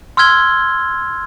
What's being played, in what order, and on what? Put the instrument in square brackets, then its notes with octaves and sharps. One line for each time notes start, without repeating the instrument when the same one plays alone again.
[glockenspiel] C6 E6 F6 G#6 G7